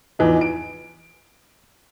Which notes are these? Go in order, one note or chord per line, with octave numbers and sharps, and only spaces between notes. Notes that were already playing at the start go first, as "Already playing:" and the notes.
E2 E3 F3 D#4
D7